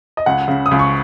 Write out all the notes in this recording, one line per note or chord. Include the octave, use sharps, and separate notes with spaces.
D#5
C#2 F#5
C#3
D#6
C#2
C#6